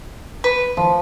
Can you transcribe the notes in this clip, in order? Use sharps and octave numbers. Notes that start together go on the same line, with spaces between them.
B4
F3